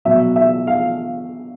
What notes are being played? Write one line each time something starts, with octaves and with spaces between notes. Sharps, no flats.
B2 F#3 E5
E5
F5